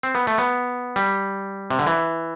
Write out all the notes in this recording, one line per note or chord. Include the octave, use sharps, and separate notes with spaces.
C4
B3
A3
B3
G3
C3
D3
E3